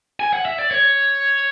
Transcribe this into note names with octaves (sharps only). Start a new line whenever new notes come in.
G#5
F#5
E5
D5
C#5